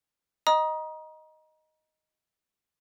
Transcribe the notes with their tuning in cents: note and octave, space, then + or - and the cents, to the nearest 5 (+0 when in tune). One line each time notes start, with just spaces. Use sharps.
D#5 +0 A#5 +30 D#6 +0